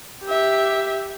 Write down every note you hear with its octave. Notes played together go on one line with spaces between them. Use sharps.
G4 E5